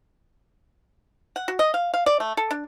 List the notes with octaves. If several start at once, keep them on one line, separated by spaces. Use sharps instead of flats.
F#5
F#4
D#5
F5
F5
D5
A3
A4
D4